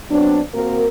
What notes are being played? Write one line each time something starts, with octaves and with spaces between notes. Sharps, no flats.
F#3 B3 C4 D4
A#3 C4 F#4 A#4